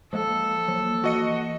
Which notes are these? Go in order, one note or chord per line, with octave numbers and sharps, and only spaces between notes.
F3 G#3 A#3 A4
F3 F#3 A#3
E3 F#4 D#5 C#7